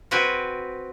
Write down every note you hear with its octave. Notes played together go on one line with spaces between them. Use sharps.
C4 F#4 B4 G5 G#5